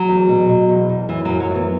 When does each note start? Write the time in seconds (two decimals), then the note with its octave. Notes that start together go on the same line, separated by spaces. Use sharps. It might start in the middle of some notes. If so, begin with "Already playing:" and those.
Already playing: F#3
0.08 E2
0.28 B2
0.49 B2
0.69 E2
0.89 E2
1.09 F#2 E3
1.25 F#2 F#3
1.40 F#3
1.50 E3
1.55 B3